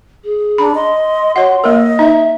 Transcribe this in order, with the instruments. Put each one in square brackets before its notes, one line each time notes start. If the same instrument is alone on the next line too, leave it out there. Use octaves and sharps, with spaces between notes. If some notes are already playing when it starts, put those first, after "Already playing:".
[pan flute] G#4
[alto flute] D4 [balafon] A#5 B5
[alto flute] D#5 [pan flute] C6
[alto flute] F#4 [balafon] C#5 F#5
[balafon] A#3 A#4 [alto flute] D#5
[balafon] D#4 [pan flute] E5